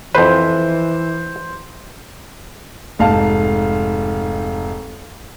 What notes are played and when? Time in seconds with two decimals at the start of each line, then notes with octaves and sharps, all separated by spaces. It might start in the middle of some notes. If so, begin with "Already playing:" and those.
0.15 F2 E3 B4 C5
2.99 F1 G#2 F5 A5